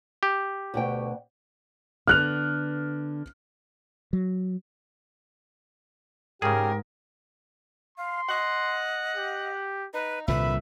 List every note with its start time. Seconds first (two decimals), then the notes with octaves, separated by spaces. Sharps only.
0.23 G4
0.74 D2 B2 G5
2.07 D3 B3 F6 F#6 F7
4.13 F#3
6.42 G#2 C#3 G4 G#4 A#4
7.98 F5 C6
8.29 D#5 F#5
9.16 G4
9.94 D#4 B4
10.28 C2 A#2 D3 B4 E5 B5